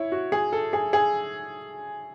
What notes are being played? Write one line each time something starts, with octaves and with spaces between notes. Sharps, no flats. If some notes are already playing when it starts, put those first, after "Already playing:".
Already playing: E4 C#5
F#4
G#4
A4
G#4
G#4